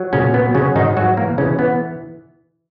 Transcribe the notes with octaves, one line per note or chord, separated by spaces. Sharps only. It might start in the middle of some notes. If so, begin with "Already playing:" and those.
Already playing: F#3
A#2 C#3 C#4
F#3 B3
C#3 F#3 C#4
G#2 D#3 D#4
G#2 F#3 F#4
E3 A#3 A#4
C#3 E3 C#4
E3 B3